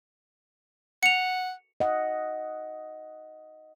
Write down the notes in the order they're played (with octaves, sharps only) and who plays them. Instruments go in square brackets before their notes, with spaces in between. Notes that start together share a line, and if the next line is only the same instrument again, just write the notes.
[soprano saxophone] F#5 [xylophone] C#7 F7
[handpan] D#5 F#5